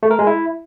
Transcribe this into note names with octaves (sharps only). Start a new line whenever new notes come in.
A3
A#4
G#3
E4